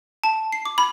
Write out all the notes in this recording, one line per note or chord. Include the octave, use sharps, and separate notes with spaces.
A5
C7
D6
B5